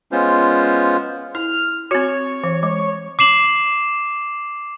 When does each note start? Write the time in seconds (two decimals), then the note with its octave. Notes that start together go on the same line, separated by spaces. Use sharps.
0.12 G#3 B3 C#4 F4 C5
1.35 E4 F6
1.91 C4 F#4 C#5
2.44 E3
2.63 G#3
3.19 D6 C7 E7 F#7